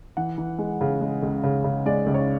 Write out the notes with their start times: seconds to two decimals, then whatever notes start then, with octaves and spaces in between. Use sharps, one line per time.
0.17 E3 F#5
0.38 E3
0.58 G#3
0.81 C#3
1.01 G#3
1.23 C#2
1.43 C#3
1.64 C#3
1.86 G#3 D5
2.06 C#2
2.14 C#5